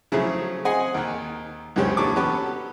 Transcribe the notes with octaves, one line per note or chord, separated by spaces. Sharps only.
C#3 F3 F#3 A3 E4 G#4
C4 G#4 D#5 F#5 G#5
D#2 D#3
C#2 F#2 C#3 G4 C5 C#5
E2 A#2 D4 A4 C#6 D6
B3 C#4 F#4 G4 A4 B4